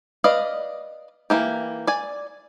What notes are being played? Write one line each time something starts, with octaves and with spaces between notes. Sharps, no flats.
B4 D5 D#5 F5
E3 A#3 G4
D5 G#5